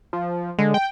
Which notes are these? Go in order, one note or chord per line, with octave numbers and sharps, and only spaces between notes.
F3
D3 G#3
G5